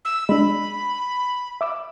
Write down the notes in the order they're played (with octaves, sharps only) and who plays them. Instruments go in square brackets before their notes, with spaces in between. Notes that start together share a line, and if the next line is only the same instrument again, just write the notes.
[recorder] E6
[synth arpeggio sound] G#3 D4 [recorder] B5
[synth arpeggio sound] E5 D6 E6